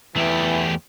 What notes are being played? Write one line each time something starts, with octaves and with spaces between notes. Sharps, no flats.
E2 E3 A3 G4